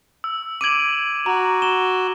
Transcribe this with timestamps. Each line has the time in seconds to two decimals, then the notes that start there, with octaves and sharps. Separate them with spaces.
0.24 E6
0.61 D6 G#6 D7 D#7 F#7
1.26 F#4 A#5
1.62 E7 G7